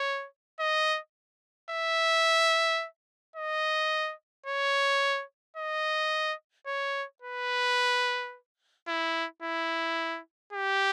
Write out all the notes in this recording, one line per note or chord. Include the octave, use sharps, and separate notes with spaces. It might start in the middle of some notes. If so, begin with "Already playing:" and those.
Already playing: C#5
D#5
E5
D#5
C#5
D#5
C#5
B4
E4
E4
G4